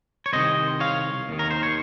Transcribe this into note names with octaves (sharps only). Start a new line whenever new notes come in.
C#5
C2 C3 D#3 C5 D#5
C#5 F5
D#2 D#3
A#4
C5
C#5